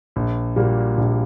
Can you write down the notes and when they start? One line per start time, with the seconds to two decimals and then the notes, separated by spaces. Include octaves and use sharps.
0.16 A#1
0.56 A#2 G3 A#3 F#4
0.97 A#1